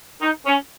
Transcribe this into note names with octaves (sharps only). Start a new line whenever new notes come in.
D#4
C#4